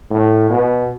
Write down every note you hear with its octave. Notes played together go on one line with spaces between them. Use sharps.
A2
B2